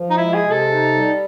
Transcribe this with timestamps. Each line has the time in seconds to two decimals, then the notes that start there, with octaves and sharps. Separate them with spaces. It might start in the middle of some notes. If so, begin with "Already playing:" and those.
Already playing: F3
0.10 D#4
0.17 G#3 E4
0.34 G#4
0.43 C3
0.51 A4
0.68 D#4
0.94 G3